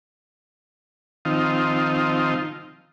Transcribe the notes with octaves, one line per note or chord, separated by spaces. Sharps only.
D#3 F3 C4 D#4 F4